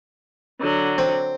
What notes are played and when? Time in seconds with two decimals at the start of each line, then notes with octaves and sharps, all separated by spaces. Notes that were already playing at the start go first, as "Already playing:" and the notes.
0.60 D3 F#3
0.98 C4